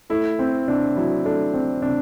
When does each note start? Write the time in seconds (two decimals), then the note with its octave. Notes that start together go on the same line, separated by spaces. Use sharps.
0.10 A3 E4
0.39 C4
0.68 C3 D4
0.96 F#3 E4
1.25 A3 D4
1.54 C4
1.82 C3 D4